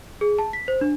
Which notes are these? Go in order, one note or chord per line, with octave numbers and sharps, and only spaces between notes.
G#4
A5
B6
C5
D4